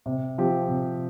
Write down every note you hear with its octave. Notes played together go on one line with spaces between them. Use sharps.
C3
F3 C4 G4
C3